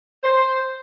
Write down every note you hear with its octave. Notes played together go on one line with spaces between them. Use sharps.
C5